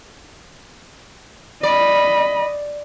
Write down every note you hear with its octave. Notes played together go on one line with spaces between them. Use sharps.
D5 D#5 B5